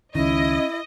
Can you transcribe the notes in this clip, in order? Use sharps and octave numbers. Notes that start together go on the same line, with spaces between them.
C#2 D#3 C#4 E4 D#5